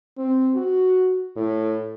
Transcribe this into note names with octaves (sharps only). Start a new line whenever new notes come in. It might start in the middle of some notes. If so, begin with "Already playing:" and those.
C4
F#4
A2